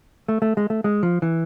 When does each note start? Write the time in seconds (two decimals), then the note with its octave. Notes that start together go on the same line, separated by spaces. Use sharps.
0.28 A3
0.42 A3
0.57 G#3
0.70 A3
0.84 G#3
1.03 F3
1.22 E3